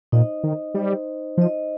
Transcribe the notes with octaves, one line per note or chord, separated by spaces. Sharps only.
A#2 D#4 C5 D#5
D#3
G3 D#4 C5 D#5
F3 D#4 C5 D#5